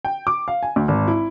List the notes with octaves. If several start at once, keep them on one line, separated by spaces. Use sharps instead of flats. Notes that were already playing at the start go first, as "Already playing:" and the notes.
G5
D6
F5
G#5
D2
G#1
E4